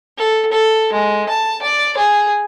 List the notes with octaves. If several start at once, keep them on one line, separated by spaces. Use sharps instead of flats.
A4
A4
G#3
A5
D5
G#4